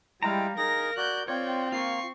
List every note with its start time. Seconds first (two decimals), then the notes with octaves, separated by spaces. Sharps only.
0.23 G3 G#3 E4 F5 G5 A#5
0.57 D#4 G#4 A#4 A#6
0.97 F#4 D5 F#6 G6
1.28 C4 F4 C#5 D5 G5
1.72 A#3 F4 C#6 C7